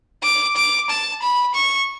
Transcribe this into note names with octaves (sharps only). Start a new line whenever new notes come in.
D6
D6
A5
B5
C#6